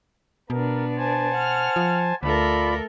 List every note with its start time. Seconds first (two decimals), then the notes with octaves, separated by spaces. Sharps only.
0.50 B2 B3 D4 A#4
0.97 C5 G#5 A5
1.32 F#5 F6
1.76 F3
2.23 D2 A3 F4 A4 A#4 D5 B5